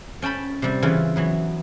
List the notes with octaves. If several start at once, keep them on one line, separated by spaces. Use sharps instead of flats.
C#4 G5 A5 B5
C3 G3
C#3 E3 F4 B5
E3 F#3 B3